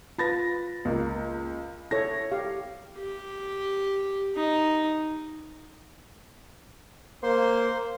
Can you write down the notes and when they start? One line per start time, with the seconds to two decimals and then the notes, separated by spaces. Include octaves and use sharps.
0.18 F4 B4 B5 A6 A#6
0.85 C#2 A#3
1.91 E4 A4 C#5 A#6
2.32 G4 F5
2.98 G4
4.36 D#4
7.23 A#3 C5 C6